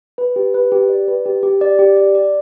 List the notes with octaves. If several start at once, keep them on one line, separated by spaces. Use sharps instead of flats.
B4
G4
B4
G4
D5
B4
G4
G4
D5
G4
D5
D5